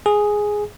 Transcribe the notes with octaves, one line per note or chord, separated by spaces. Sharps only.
G#4